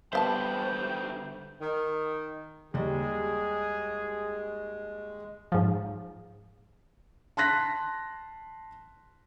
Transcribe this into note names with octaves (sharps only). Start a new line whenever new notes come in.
D3 G3 B3 C5 E5 F5 G5 A5
D#3
D#2 G3 G#3 G#4
G#2 F3
A5 C6 F#6 A#6 B6